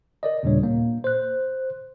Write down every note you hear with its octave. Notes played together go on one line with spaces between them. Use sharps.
A#4 D5 D#5
D#2 A#2 C#3 G3 D4 C#5
A#2 A#3
C5 F#6